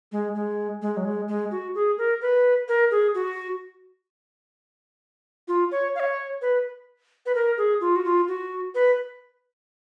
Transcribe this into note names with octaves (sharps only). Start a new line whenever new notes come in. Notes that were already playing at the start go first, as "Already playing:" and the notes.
G#3
G#3
G#3
F#3
G#3
G#3
F#4
G#4
A#4
B4
A#4
G#4
F#4
F4
C#5
F5
C#5
B4
B4
A#4
G#4
F4
F#4
F4
F#4
B4